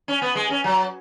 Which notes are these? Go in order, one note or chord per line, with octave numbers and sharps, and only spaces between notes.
C#4
B3
G#3
C#4
F#3